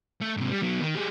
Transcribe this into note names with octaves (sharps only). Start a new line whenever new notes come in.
A3
G#2 C3
G3
F#3 B3
D#3
G3 G#4